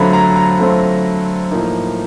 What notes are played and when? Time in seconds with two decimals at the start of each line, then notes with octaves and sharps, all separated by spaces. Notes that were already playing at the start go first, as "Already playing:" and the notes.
Already playing: D3 F#3 A3 C4 F4 A#5 B5
0.13 A#5
0.36 A#5
0.58 D3 F#3 A3 C4 F4
1.51 A2 F3 A#3 D#4